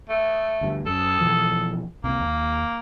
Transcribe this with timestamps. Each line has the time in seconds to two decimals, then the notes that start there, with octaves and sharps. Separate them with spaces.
0.09 A3
0.61 D2 G2
0.86 F#2 A4
1.20 B2 E3 F3
2.04 C#2 C3 A#3
2.21 D#2